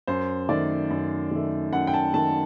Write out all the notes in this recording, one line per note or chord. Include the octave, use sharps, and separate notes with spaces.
F#2 C5
D#3 A3 D5
F#2
D#3 A3
F#2 F#5
G5
A5
D#3 A3 A5